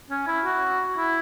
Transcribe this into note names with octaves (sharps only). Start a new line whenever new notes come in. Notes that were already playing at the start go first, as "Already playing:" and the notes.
C#4
E4
F#4
E4